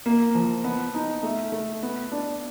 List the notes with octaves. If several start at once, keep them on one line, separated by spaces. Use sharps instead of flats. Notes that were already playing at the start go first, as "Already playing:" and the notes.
A#3
F3
B3
D#4
A3
A3
B3
D4